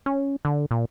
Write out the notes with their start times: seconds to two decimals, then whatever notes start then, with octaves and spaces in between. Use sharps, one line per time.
0.06 C#4
0.45 D3
0.71 A#2